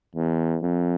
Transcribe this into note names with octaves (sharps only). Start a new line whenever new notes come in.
E2
F2